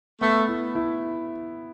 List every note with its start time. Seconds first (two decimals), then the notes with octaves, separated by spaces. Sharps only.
0.21 A3 B3
0.48 E4
0.75 E4